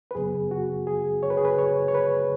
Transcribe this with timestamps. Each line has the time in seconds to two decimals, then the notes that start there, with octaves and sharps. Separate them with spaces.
0.11 B4
0.15 F#2 C#3 F#3 B3 G#4
0.51 F#4
0.87 G#4
1.23 C#5
1.30 B4
1.37 G#4
1.45 B4
1.58 C#5
1.88 C#5
1.95 B4